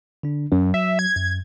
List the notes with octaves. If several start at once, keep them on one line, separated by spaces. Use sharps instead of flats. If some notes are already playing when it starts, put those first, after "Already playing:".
D3 D4
F#2 F#3
E5
G#6
F#2